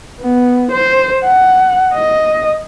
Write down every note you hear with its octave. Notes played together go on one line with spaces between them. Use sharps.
B3
C5
F#5
D#5